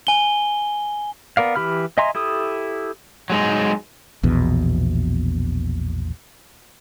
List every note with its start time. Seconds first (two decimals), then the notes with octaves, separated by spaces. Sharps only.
0.07 G#5 G7
1.37 B3 A#4 D5 F5
1.56 E3 G4 B5 F6
1.98 D#5 E5 G#5 A#5 C6
2.15 E4 G4 A4 D#6
3.30 F#3 G#3 D#4
4.23 A#1 E2 B2